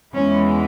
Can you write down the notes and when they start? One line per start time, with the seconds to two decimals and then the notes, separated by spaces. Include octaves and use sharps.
0.14 E2 E3 G#3 C#4